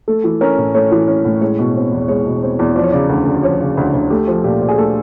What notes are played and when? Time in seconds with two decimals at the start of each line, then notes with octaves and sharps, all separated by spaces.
0.08 A3 A4
0.24 E3
0.41 C#4 A#4
0.58 A2
0.75 A3 C#5
0.92 E3
1.08 C#4
1.25 A2
1.41 G#3 C#5
1.59 B2
1.76 C4
1.92 E2
2.08 G#3 C#5
2.26 B2
2.42 C4
2.59 E2
2.76 F3 D5
2.84 C#5
2.91 C#3 D5
3.09 D2
3.26 D2
3.43 F3 C#5
3.60 C#3
3.77 D2
3.94 D2
4.10 A3 G4
4.27 F3
4.44 A#2 G4
4.61 A#2
4.69 G#4
4.78 A3 A4